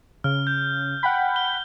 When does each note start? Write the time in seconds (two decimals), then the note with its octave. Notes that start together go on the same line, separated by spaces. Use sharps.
0.24 C#3 F6
0.47 G6
1.03 F#5 G5 B5
1.36 G7